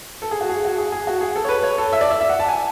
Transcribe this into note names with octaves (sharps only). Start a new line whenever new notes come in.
A4
G#4
F#4
G#4
F#4
G#4
G#4
F#4
G#4
A4
C#5
B4
C#5
A4
E5
D5
E5
E5
F#5
A5
G#5